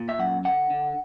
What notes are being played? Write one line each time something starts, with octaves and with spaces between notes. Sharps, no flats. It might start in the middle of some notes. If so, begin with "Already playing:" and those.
Already playing: A#2
E5
F#2 F#5
D3 F#5
D3